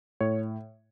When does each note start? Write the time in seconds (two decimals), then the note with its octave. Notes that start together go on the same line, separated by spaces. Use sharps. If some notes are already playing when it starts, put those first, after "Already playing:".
0.21 A2 C#5